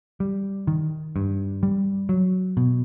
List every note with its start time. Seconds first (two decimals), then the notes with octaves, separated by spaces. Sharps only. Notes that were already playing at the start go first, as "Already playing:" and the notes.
0.20 G3
0.67 D#3
1.16 G2
1.63 G3
2.09 F#3
2.57 B2